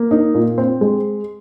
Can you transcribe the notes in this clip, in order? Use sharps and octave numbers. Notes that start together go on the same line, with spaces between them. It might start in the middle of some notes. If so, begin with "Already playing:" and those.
Already playing: A#3
D#4
A#2
C4
G#3